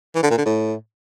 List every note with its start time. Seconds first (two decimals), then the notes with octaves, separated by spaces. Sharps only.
0.15 E3
0.23 D3
0.30 A#2
0.38 D3
0.45 A2